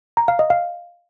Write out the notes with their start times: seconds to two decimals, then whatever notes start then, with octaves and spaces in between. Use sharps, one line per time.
0.17 A#5
0.28 F5
0.39 D#5
0.50 F5